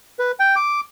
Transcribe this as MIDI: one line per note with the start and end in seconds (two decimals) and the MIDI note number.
0.19 0.32 71
0.40 0.55 79
0.56 0.80 86